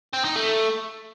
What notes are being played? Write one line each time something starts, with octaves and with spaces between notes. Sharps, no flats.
C4
D#4
A3